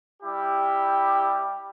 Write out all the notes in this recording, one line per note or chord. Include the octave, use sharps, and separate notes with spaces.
G3 E4 G4